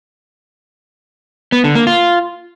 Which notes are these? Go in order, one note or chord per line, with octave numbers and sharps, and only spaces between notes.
B3
D3
A#3
F4